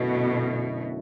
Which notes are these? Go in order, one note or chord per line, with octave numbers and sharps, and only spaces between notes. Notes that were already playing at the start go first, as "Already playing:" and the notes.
Already playing: F#2 B2 D3 A3 E4